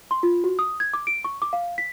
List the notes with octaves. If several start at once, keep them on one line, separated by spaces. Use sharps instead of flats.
C6
F4
F#4
D#6
G#6
D6
D7
C#6
D6
F5
B6